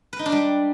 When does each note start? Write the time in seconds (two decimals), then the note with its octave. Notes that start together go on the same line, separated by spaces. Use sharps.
0.13 B4
0.19 D#4
0.26 D4
0.32 G3